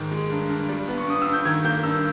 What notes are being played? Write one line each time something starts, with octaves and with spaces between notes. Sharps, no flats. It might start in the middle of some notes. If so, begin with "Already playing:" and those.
Already playing: G#2 D#3
G#3
G2
G2
G3
B3
C#6
G2 D#6
G2 E6
G6
D#3 G#6
A#3 G6
G2 E6